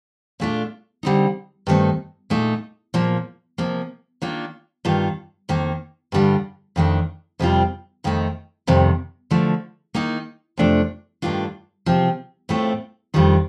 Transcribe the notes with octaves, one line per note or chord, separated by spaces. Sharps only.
A#2 A3 D4 F4
D3 G3 C4 D#4
G2 D#3 A3 C4 D#4
A#2 A3 D#4
A#2 F3 A#3
C3 F3 A#3
D#3 A#3 D4 F4
G2 D#3 A#3 F4
F2 D#3 A#3
G2 D3 G3 D4 F4
F2 D#3 A3 D4
F2 C3 G3 C4 F4
F2 D#3 A3 D#4
F2 C3 D#3 G3
D3 F3 A3
D#3 A#3 D#4
F2 C3 F3 A3 D4
G2 D#3 A3 D4 F4
C3 F3 C4
A2 A3 C4 F4
F2 D#3 G3 D4 F4